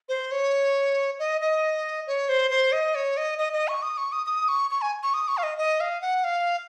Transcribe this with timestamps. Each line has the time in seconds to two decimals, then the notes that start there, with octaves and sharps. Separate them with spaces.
0.09 C5
0.32 C#5
1.19 D#5
1.41 D#5
2.07 C#5
2.29 C5
2.51 C5
2.72 D#5
2.95 C#5
3.17 D#5
3.39 D#5
3.53 D#5
3.68 C#6
3.82 D#6
3.97 C#6
4.12 D#6
4.26 D#6
4.48 C#6
4.71 C#6
4.82 G#5
5.03 C#6
5.14 D#6
5.28 C#6
5.37 F5
5.43 D#5
5.58 D#5
5.80 F5
6.02 F#5
6.24 F5